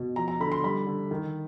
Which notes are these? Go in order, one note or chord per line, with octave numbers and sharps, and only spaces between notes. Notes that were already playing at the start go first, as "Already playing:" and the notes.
Already playing: B2
F3 A#5
A#5
D3 B5
C6
G3 B5
D3
D#3